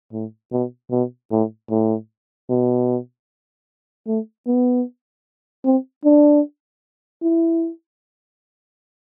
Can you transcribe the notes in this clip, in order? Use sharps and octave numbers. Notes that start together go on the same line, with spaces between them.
A2
B2
B2
A2
A2
B2
A3
B3
C4
D4
E4